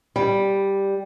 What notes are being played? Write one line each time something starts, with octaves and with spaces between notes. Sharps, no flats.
G3